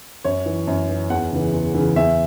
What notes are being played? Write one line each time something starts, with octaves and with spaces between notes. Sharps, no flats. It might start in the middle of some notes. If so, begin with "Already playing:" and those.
F#2 C#5
E3
F#2
E3
E2 F#5
C#3 E3
E2
C#3 E3
E2 E5